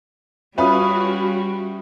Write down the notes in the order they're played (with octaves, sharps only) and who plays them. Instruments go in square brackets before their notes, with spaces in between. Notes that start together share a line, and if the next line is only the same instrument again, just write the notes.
[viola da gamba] G3 [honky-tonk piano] C#4 F4 B4 [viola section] F#4 [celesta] E5 B5 D#6